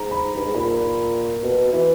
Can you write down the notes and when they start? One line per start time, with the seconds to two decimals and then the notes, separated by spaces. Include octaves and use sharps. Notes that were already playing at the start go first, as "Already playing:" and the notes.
Already playing: G#2 A#5
0.11 B5
0.35 G2
0.45 G#2
0.54 A#2 B5
1.43 B2
1.73 E3